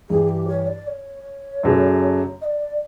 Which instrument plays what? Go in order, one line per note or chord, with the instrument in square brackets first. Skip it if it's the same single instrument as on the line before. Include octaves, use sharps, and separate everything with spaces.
[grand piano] G2 E3 G3 [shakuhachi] G#4
[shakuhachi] G4
C#5
D5
C#5
[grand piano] F#2 C#3 F#3 A3 D4
[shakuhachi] D#5
D5